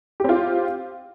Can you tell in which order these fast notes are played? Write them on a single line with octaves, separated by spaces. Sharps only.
G4 C4 F4